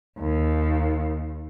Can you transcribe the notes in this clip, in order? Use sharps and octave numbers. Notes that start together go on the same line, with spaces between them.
D#2